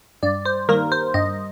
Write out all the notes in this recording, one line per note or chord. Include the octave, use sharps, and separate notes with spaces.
G2 D5
C5
D#3 G3 A#3 A#4
C5
G2 D#5